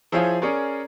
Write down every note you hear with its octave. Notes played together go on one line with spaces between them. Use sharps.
F3 E4 G#4 C5 C#5 F5
C#4 G#4 A#4 C#5 D5